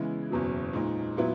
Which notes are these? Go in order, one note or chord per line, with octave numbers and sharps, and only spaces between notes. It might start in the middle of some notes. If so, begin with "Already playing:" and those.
Already playing: C#3 E3 G#3 B3 E4
F#1 E2 B2 F#3
A#2 G#3 D#4
A#2 F#3 B3 E4